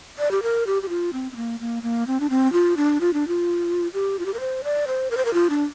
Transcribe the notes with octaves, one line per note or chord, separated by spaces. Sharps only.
D5
G4
A#4
G4
G4
F4
C4
C4
A#3
A#3
A#3
C4
D4
C4
F4
D4
F4
D4
F4
G4
F4
G4
A#4
C5
D5
C5
A#4
C5
A#4
F4
D4